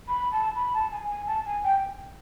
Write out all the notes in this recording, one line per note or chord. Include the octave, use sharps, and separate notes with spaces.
B5
A5
B5
A5
G#5
G#5
A5
G#5
G5